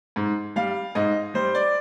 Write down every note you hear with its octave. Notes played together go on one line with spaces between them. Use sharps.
G#2
G3 F5
G#2 D#5
G3 C5
D5